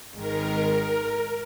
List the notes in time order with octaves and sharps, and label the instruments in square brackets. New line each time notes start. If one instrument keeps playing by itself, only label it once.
[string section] G#1 G#2 D#3 G#3 [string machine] A#4
[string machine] A#4